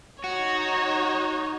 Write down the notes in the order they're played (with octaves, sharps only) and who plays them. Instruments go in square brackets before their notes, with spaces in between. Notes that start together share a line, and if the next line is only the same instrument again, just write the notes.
[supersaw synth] D#4 [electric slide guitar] F#4 [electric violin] C#5